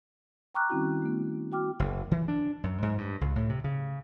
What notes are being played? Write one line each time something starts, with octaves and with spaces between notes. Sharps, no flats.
G5 A#5 C#6 D6 F6 F#6
D#3 G3 C4 C#4 E4 F#4
A3 B3
F#4 G5 D6 F6
F#1
E3
D4
F#2
G#2
G2
C#2
A2
C3
C#3